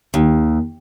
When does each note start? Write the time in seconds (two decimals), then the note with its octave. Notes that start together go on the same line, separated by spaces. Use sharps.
0.14 D#2